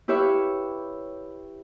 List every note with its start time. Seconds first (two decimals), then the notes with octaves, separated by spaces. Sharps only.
0.08 E4 G4 B4 C#5 E5 F5